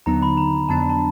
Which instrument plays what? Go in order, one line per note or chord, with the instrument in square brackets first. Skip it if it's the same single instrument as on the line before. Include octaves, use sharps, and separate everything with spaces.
[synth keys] D#2 D3 F#3 B3 D#4 [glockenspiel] A#5
[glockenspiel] B5
A#5
[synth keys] F2 D3 F#3 B3 D4 [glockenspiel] A5
[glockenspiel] A5